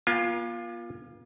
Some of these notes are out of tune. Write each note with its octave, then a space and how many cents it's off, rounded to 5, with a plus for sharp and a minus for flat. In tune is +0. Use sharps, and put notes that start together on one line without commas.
A#3 +45 F4 +0 G#5 -45